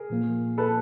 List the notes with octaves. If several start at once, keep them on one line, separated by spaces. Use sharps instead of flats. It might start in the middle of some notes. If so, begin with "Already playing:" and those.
Already playing: G#4 A#4
A#2 F3 A#3
A4 B4